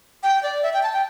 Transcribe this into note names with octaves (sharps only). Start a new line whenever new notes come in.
G5
D5
E5
G5
A5
G5